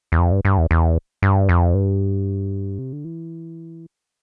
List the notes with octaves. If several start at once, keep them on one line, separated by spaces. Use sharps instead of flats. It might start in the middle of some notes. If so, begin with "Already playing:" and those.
E2
F2
G2
G2
E2
E2
G2
F2
G2
C3
D3
E3